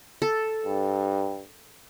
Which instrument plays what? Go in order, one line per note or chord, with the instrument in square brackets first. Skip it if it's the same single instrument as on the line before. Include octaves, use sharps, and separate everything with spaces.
[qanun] A4
[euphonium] G2